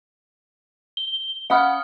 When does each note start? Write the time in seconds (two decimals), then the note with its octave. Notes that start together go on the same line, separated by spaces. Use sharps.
0.97 G7
1.50 C#4 F5 F#5 B5 D#6 F6